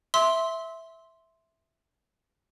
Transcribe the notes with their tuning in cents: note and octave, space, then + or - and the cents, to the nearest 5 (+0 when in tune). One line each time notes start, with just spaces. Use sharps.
E5 -5 C6 +0 E6 -25